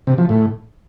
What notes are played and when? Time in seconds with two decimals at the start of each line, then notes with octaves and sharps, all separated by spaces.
0.07 C3
0.18 F3
0.29 A2